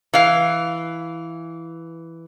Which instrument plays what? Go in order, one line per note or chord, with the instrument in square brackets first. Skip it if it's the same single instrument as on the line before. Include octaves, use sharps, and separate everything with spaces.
[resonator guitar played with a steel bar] E3 F5